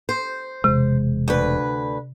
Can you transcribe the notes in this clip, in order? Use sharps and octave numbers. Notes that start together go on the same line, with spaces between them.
C5
E1 C3 G#3
D2 B4